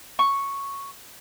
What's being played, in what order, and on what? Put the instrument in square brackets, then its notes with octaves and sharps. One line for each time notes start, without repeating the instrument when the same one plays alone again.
[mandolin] C#6